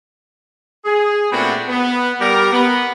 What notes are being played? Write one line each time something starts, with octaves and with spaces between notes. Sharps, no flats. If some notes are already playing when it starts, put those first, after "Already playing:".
G#4
A#2 A3 B3 C4 D4 F#4
B3
G3 G4 A#4
B3